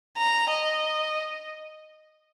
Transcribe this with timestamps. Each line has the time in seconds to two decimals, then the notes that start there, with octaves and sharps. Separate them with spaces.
0.18 A#5
0.50 D#5